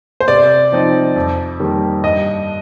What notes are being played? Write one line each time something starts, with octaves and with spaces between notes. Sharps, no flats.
C5
C3 D5
F3 C4 D#4
F2
D#3 G3 A#3
G2 D#5